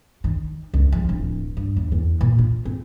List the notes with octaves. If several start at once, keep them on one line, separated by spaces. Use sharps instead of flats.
D#3
C#2
F3
D1
G2
D#2
E2
A#2
F4
C4